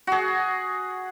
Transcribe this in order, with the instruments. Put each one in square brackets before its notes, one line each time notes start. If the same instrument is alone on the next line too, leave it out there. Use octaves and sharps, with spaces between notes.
[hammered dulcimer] F#4 G#4